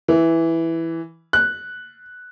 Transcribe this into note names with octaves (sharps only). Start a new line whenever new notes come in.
E3
F#6